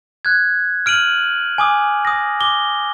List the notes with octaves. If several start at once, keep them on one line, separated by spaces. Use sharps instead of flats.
F#6 G#6
F6 D7 D#7 F#7
G#5 D6 D#6
D#6 A#6
D6 G7